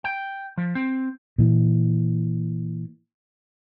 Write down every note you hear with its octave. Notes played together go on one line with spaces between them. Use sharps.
G5
F3
C4
A#2 E3